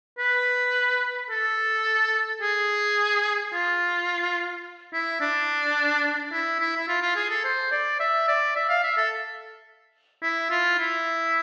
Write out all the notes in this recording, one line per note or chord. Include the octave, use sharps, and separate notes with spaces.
B4
A4
G#4
F4
E4
D4
E4
E4
E4
F4
F4
G#4
A4
C5
D5
E5
D5
E5
F5
E5
A4
E4
F4
E4